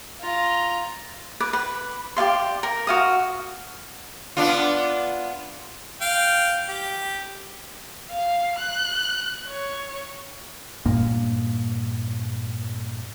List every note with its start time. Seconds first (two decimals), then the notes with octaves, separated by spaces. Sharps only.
0.20 F4 A#5
1.40 B4 D6
1.53 B4
2.16 G4 D5 F5 C6
2.63 A#4
2.87 F#4 F5 D#6
4.37 B3 D4 F4
6.01 F5 G5
6.69 G4
8.10 F5
8.58 F#6
9.49 C#5
10.85 G2 A#2 A#3